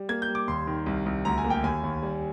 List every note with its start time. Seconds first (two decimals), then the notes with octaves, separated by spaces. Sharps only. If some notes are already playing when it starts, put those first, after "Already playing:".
Already playing: G3
0.09 A#3 G#6
0.22 G6
0.28 G3
0.35 D6
0.48 D#2 C6
0.67 D#3
0.86 C2
1.06 C2
1.25 D2 A#5
1.38 G#5
1.44 A#3
1.50 G5
1.63 D#2 G#5
1.83 D#2
2.03 G3